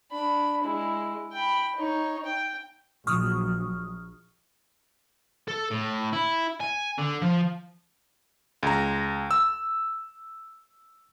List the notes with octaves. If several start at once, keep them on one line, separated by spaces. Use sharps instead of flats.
D4 B5
G#3 E4
G5 B5
D#4 C#5
G5
A#1 F#3 C#6 D#6 F6
A4
A2
E4
G#5
D3
F3
C#2 A#5
E6